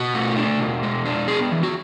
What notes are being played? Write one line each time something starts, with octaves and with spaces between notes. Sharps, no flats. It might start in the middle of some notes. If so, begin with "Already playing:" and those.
Already playing: B2 F#4
A3
D4
B2
G#3
D4
B3 G#4
E3
F#4